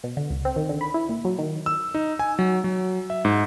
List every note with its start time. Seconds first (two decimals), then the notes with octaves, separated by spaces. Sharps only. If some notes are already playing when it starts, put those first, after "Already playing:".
0.04 B2
0.17 D3
0.30 C#2
0.45 C4
0.56 D#3
0.69 D3
0.81 B5
0.94 E4
1.09 A#2
1.25 F#3
1.39 D#3
1.66 E6
1.94 D#4
2.19 G#5
2.39 F#3
2.64 F#3
3.10 E5
3.25 G#2